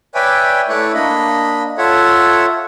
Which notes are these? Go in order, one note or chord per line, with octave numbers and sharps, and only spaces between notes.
B4 C#5 D5 E5 G5 G#5
A3 E4 B4 C#5 D5 C#6
A#3 D4 D#5 B5
F4 A4 C#5 E5 F#5